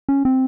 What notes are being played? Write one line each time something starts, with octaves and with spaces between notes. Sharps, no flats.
C#4
C4